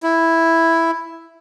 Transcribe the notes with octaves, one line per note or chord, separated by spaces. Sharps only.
E4